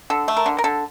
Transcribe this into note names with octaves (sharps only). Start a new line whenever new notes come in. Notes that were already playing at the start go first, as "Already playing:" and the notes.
D3 A4
A3
A#4
D3
A#4
D3 A4